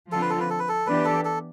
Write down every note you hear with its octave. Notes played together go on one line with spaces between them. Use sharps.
D3 F3 C4 F4 A4
B4
A4
B4
A4
B4
A4
E3 B3 D4 G4 B4
A4
A4